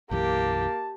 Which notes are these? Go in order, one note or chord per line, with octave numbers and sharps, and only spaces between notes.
B1 F#2 E3 A#3 G4 A5